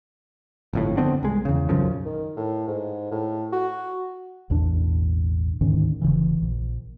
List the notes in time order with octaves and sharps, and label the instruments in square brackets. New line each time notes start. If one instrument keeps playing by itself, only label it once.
[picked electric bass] G1 F2 A2
D3 B3 C4 D4
C2 G#3
E2 C#3
B1 F#2 C#3 F3
[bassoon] D#3
A2
G#2
A2
F#4
[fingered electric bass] A1 E2 B2 D4
D2 G#2 D#3 C#4
F1 C#2 C#3 E3
A#1